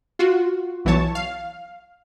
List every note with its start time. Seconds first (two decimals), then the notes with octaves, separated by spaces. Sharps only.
0.19 F4 F#4
0.85 B1 E3 F#3 C#5 A5
1.15 F5